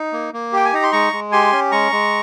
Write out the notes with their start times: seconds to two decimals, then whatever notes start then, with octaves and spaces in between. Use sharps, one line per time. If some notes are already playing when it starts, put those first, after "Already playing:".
Already playing: D#4
0.13 A#3
0.33 A#3
0.53 G4 G5
0.65 G#5
0.73 D#4 A#5
0.83 C6
0.92 G#3 A#5 C#6
1.13 G#3
1.32 G4 G#5 C6
1.52 C#4
1.71 G#3 A#5 C#6
1.92 G#3